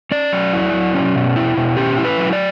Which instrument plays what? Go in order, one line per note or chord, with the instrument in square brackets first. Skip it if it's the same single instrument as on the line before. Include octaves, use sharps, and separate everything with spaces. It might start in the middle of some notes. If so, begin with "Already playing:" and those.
[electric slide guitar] C#4 D5
F#3
E4
F#3
C#4
B2
E4
B2
C#4 G4
E4
B4
F#3
D5